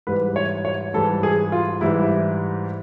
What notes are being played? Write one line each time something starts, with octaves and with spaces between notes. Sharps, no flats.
G#2 E3 G3 B4
C#5
C#5
G#2 E3 G3 A4
G#4
F4
G#2 E3 G3 E4